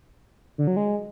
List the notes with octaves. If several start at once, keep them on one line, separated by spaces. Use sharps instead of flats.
D3
F#3
G#3